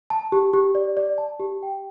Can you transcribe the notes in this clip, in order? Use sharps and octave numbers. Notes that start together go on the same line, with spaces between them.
A5
G4
G4
D5
D5
A5
G4
G5